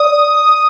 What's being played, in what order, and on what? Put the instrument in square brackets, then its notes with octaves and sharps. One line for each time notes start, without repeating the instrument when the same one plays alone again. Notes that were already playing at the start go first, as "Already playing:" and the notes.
Already playing: [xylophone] D5 [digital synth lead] D#6